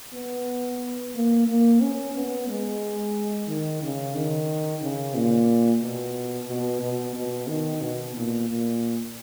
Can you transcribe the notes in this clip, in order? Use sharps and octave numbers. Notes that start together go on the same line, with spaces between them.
B3
A#3
A#3
C#4
B3
G#3
D#3
C#3
D#3
C#3
A#2
B2
B2
B2
B2
D#3
B2
A#2
A#2